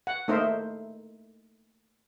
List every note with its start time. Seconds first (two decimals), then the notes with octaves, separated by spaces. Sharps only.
0.07 F#5
0.28 A3 A#3 D#4 A#4 C5 E5